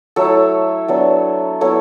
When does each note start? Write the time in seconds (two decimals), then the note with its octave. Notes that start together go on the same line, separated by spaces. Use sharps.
0.16 F#3 A3 E4 A4 C#5
0.88 F#3 B3 D4
1.61 F#3 B3 E4 A4 C#5